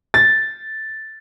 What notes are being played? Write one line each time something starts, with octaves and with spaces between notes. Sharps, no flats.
A6